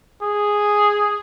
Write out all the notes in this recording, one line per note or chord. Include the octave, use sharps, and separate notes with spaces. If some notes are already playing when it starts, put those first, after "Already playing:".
G#4